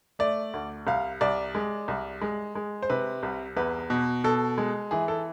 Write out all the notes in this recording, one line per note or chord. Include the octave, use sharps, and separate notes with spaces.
A3 D5
D2
C2 F5
C2 D5
G#3
C2
G#3
G#3
C5
C3 B4
C2
E2 B4
B2
B2 A4
G#3
E3 G#4
A4